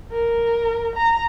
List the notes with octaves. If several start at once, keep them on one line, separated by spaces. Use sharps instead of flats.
A#4
A#5